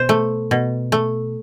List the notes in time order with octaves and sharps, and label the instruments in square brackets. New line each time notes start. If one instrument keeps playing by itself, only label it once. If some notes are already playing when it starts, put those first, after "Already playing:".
Already playing: [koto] B2 C5
A3
B2
A3